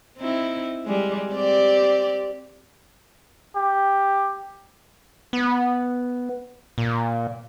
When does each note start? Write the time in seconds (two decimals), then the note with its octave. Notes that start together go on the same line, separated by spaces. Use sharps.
0.18 C4 D#4 E4
0.85 G3 G#3
1.33 C4 G4 D5
3.56 G4
5.33 B3
6.78 A#2